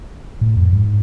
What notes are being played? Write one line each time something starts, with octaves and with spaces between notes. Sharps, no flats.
A2
F2
G#2